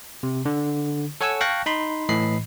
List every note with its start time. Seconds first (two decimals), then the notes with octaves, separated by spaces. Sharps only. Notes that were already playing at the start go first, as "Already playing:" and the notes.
0.23 C3
0.45 D3
1.21 A4 C#5 F#5 G#5 C#6 E6
1.41 F5 G5 A5 C#6 F#6 A#6
1.66 D#4 B5 C6
2.09 A2 E3 D#5 B5 C7